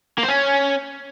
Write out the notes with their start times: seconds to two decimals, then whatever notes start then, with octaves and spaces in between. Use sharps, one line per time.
0.18 A#3
0.23 C5
0.28 C#4